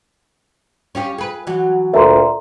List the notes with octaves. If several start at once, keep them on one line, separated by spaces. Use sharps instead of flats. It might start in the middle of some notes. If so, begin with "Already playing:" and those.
C#4 F4 G4
G#4 B4
E3 F#3 F#4
D2 A#2 E5 A#5 C6